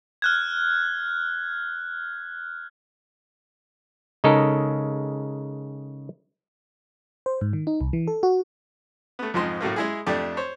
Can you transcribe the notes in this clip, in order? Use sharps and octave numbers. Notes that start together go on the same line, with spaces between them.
F6 F#6 G#6
C#3 G#3 D#4 A4 A#4
C5
G#2
D#3
D#4
C2
E3
A4
F#4
A3 B3
F2 G#2 F3 D#4 C6
A2 F#3 A3 A#3
G#3 E4 G#4
F2 A3 D4 G4
C5 C#5